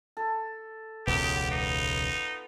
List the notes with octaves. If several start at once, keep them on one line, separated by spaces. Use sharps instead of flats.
A4
E1 C#2 B3 F4 G4
D#4